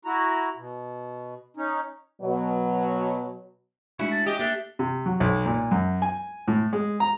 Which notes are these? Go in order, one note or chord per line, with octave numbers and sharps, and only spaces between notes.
E4 F#4 A#5
B2
C#4 D#4
B2 F#3
G#3 A3 C#4 D4 E4 F#4 C#6
A5
G4 D#5
A3 A#3 D4 E5
C3
F#3
B1
A#2
F#2
G#5
A2
G#3
A#5